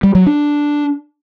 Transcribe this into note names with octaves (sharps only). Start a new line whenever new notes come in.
G3
F#3
D4